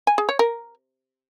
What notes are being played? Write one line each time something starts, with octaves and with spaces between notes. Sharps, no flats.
G#5
G#4
C#5
A#4